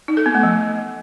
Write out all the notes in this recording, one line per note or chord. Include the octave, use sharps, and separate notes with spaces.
D#4
A4
B3
A3
F3